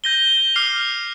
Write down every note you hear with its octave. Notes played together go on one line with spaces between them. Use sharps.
G6 A#6 D#7 G7
D6 F6 C7 F7